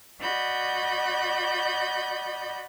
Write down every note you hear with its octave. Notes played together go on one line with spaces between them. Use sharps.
F#4 D5 D#5 B5 G6